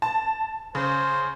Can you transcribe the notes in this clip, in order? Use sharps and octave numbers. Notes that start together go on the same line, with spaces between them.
A5
C#3 C5